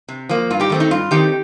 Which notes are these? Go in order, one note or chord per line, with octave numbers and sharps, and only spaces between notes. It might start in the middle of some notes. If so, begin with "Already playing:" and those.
C3
F3 A#3
G2 F4
D#4 G4
D#3 A3 C4
D#4
G2 F4
D#3 A3 C4 D#4 G4